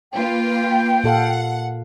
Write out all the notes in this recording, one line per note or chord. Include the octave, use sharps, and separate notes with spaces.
A#3 F4 B4 G5
A#2 A4 F5 F#5